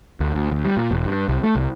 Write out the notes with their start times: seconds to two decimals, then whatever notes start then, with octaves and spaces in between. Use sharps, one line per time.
0.20 D2
0.35 D2
0.51 D2
0.65 G3
0.77 A#2
0.91 E1
1.06 G2
1.28 C2
1.43 A3
1.55 C2